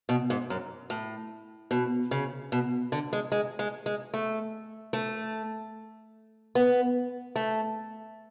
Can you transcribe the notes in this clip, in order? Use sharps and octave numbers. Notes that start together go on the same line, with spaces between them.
B2
G#2
F#2
A2
B2
C#3
B2
D3
G#3
G#3
G#3
G#3
A3
A3
B3
A3